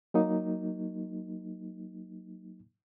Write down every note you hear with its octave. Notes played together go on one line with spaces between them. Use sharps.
F#3 A#3 D#4